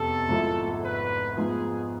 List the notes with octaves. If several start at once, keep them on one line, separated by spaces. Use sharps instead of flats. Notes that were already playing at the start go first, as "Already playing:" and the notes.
Already playing: F1 E2 C3 A4
G#1 G#2 F3 A3 E4
B4
G#2 F3 B3 G#4